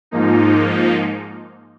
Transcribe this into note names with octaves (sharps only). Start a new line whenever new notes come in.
G#2 F3 A#3 D#4